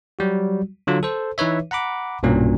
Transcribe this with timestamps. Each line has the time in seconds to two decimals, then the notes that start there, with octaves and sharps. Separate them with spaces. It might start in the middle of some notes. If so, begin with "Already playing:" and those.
0.19 F#3 G3 F#4
0.87 D3 F#3 F4
1.03 A4 C5
1.38 E3 D#4 B4 C#5 E5
1.71 F#5 A#5 B5 D6
2.23 B1 G2 A#2 F#3 C#4